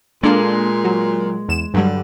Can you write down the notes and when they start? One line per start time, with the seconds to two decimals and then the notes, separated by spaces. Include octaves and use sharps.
0.23 A#2 G#3 A#3 D4 A4
0.84 F#3
1.48 E2 E7
1.74 G2 D3 F#3 G3